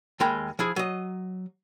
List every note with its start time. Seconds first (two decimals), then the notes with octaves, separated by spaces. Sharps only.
0.20 D#2 G#3 A#4 G5 B5
0.59 F3 E4 G#4
0.76 F#3 D#5